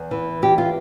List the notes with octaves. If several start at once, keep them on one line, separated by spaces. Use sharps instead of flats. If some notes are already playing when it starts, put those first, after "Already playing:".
Already playing: E2
E3
E2 G4
F4